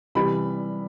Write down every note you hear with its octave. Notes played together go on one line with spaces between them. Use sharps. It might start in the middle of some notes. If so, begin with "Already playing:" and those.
C3 E3 G3 B5